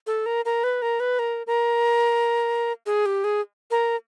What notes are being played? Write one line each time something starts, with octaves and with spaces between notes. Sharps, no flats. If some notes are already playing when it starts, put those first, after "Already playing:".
A4
A#4
A#4
B4
A#4
B4
A#4
A#4
G#4
G4
G#4
A#4